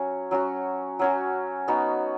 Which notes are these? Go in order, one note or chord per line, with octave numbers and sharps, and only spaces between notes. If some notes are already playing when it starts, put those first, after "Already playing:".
Already playing: F#3 C#4 F#4
F#3 C#4 F#4
F#3 C#4 F#4
B3 D#4 F#4